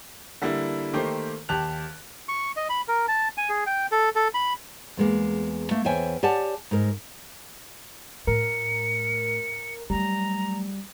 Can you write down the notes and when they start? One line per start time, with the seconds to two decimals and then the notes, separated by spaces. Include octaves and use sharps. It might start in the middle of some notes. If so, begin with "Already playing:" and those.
0.42 D3 G3 A#3 E4
0.93 D#3 A3 A#3 G4 C5
1.49 D#2 G4 A5 F#6 F7
2.28 C#6
2.57 D#5
2.70 B5
2.88 A#4
3.08 A5
3.38 G#5
3.49 G#4
3.66 G5
3.92 A4
4.16 A4
4.34 B5
4.97 E2 G#3 A#3
5.71 A3 A#3
5.85 E2 C5 C#5 E5 G5 G#5
6.23 G4 C#5 D5 F#5 G#5 A5
6.71 G#2 A#4
8.27 A2 A#4 C#7
9.90 F#3 G3 A3 A#5